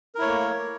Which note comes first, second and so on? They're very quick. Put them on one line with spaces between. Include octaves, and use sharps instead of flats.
A#4 E4 C#5 A3 A#3